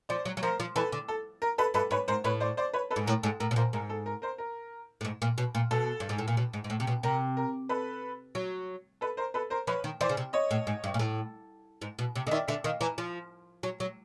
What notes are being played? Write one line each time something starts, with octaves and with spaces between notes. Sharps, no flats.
F3 C5 D5
F#3
F#3
F3 A#4 C5
F3
E3 A4 B4
D3
A4
A#4
A4 B4
G2 A4 B4
G#2 B4 C#5
G#2 A#4 C5
A2 B4 C#5
C5 D5
C5 D5
B4 C#5
A4 B4
G#2
A2 A#4
G#2 A4
A2 A#4
B2
A#2 A#4 C5
G#2 A#4
A4
A#4
A#4 C5
A#4
A2
G#2
A#2
B2
A#2
B2 A4
G2
G#2
A2
A#2
B2
G#2
G#2
A2
C3
B2
C3 A#4
A#4
A4 B4
F#3
A4 B4
A#4 C5
A4 B4
A#4 C5
F3 B4 C#5
D#3
E3 C5 D5
C#3
C3
C#5 D#5
A2
G#2
G2
A#2
A2
G#2
B2
C3
D3 D#5
D#3 D5 E5
D3 D5 E5
D#3 D#5 F5
E3 G#5 A#5
F3
F#3
F#3